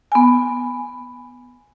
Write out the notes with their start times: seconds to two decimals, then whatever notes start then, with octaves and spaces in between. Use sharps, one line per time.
0.12 B3 G#5